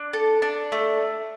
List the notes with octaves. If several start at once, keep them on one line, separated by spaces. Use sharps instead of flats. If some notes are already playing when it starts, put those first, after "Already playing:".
Already playing: D4
A4
D4
A3